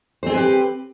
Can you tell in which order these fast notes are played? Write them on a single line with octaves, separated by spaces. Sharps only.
C5 C4 G#4 B4 G4